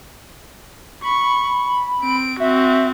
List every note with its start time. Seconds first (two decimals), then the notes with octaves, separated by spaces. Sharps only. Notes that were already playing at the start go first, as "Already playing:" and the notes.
1.04 B5 C#6
2.01 C4 D7
2.40 C4 F#4 E5